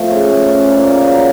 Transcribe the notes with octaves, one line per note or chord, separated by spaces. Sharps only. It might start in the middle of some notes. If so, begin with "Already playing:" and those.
Already playing: F3 A3
C#3
A3
C#4
A#2
A#2
F#3